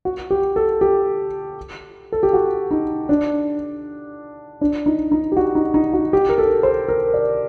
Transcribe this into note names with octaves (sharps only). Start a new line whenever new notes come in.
F#4
G4
A4
G4
A4
G4
F#4
D#4
D4
D4
D#4
D#4
G4
F#4
D#4
D#4
F#4
G4
A#4
A4
C5
A#4
D5